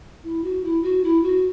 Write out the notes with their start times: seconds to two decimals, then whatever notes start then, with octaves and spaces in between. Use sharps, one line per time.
0.24 E4
0.44 F#4
0.64 E4
0.83 F#4
1.04 E4
1.23 F#4